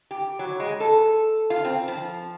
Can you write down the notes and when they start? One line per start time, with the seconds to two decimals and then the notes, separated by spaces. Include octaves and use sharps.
0.11 G4
0.39 F#3
0.60 G#3
0.80 A4
1.50 F4
1.65 C4
1.88 F3